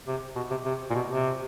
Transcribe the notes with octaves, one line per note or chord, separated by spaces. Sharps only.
C3
B2
C3
C3
A#2
B2
C3